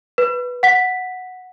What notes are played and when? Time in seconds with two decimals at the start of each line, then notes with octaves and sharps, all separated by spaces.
0.18 B4
0.63 F#5 B6